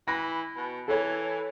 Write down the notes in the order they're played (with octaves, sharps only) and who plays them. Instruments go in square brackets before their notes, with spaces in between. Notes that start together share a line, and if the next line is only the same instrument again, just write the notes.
[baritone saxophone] E3 [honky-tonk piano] B5 A#6
[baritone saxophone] B2
[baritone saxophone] E3 [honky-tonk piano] A4 C#5